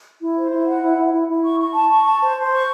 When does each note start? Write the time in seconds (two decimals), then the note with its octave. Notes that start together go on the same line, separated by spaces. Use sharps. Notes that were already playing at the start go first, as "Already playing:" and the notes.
0.21 E4
0.37 C5
0.51 E4
0.66 F#5
0.82 E4
0.98 E4
1.13 E4
1.28 E4
1.45 C#6
1.60 C#6
1.75 A5
1.91 C#6
2.05 A5
2.22 C5
2.37 C5
2.52 C#6